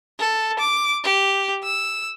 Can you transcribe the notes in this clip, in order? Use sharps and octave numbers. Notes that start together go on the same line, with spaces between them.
A4
D6
G4
E6